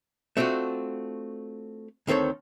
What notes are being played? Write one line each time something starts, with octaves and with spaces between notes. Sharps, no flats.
A3 C4 D4 F4 F#4
D2 D#3 C4 A4 C#5